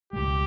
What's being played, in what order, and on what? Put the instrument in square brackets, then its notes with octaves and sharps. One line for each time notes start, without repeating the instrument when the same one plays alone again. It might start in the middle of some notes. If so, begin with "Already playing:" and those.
[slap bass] C#2 B2 G#3 [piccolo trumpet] G4